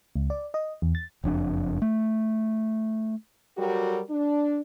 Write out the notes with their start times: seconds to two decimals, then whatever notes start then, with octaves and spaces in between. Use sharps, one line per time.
0.16 C#2
0.30 D5
0.54 D#5
0.82 E2
0.95 A6
1.24 F#1 F2 D4
1.82 A3
3.58 F#3 G3 F#4 G4 A4 A#4
4.10 D4